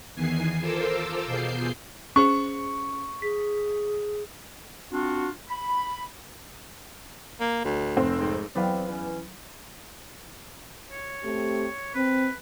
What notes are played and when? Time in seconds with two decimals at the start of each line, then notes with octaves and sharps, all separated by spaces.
0.15 E2 D#3 E3 B3 G#5 C7
0.61 F4 A4 A#4 C5 D6 E6
1.26 B2 F4 G#4 G6 C7
2.16 C#4 G#4 C5 C#6
3.22 G#4 B6
4.91 C4 D4 F4 F#4
5.48 B5
7.40 A#3
7.65 D2
7.97 F1 C4
8.19 G#2
8.55 E2 F#3 B3 C4 B4 D5 F5
8.89 E3 C#4
10.91 C#5
11.23 A3 C4 G4
11.95 C4 B4